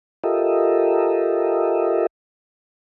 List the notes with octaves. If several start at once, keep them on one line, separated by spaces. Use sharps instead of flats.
F4 G4 A4 A#4 D#5 E5